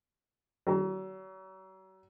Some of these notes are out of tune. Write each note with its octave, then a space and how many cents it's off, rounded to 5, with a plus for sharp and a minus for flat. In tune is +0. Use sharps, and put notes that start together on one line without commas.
F#3 +40